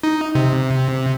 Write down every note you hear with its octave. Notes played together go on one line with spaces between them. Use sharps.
D#4
C3